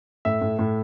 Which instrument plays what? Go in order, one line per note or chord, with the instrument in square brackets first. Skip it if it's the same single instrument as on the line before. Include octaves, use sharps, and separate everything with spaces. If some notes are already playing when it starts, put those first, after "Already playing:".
[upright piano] A2 E5
A2
A2